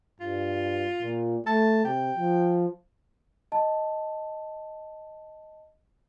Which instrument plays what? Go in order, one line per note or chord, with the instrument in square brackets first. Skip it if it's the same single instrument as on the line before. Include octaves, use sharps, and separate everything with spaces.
[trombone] G2 [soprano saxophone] F4
[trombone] A#2
[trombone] A3 [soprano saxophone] A5
[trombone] C3 [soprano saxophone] G5
[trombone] F3
[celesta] D#5 A5